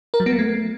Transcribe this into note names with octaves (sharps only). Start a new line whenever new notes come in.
A#4
F#3
B3
A#3
A3